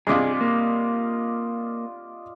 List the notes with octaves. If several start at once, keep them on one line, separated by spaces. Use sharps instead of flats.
G2 C3 F4 G#4 D5 D#5
A#3